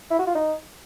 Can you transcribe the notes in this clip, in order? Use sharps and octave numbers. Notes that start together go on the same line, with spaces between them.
E4
F#4
F4
D#4